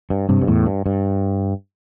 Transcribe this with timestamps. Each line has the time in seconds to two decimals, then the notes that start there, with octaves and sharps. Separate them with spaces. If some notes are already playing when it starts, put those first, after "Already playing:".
0.10 G2
0.29 G2 C3
0.41 G2
0.47 E2 A2
0.66 G2
0.86 G2